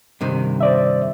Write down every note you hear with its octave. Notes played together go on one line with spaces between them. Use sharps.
G2 C3 D#3
C5 D5 E5